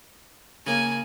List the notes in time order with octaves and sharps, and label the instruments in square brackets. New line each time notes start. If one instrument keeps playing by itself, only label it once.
[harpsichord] C#3 A#3 [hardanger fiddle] G#5